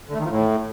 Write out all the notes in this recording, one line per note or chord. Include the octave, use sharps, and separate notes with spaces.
D3
A3
D#3
F3
A2